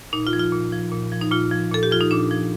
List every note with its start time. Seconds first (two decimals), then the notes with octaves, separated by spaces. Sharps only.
0.13 A#2 D#4
0.27 F4
0.33 F3
0.39 F4
0.52 A#2
0.72 F3
0.92 A#2
1.12 F3
1.21 D#4
1.31 A#2 F4
1.51 F3
1.71 A#2 A4
1.83 G4
1.91 F3 F4
2.01 D#4
2.11 A#2 D4
2.31 F3